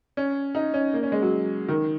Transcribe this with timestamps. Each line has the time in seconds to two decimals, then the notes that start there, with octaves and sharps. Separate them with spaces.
0.17 C#4
0.55 D#4
0.74 C#4
0.94 A#3
1.03 C#4
1.12 G#3
1.22 F#3
1.68 D#3